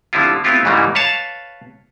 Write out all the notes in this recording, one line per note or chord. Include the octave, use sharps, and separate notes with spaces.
D3 F3 G3 C4 E4 F4
A3 B3 C4 E4 F4 G4
G#2 C#3 E3 G3 A3 A#3
B4 C#5 F5 A5